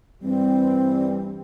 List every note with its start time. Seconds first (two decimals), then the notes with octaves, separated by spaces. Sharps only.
0.22 G2 E3 G3 C4